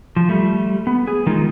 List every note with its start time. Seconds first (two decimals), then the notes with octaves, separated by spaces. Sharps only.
0.16 F3
0.29 G3 A3
0.87 B3
1.07 G#4
1.26 D#3 G#3 D#4 F4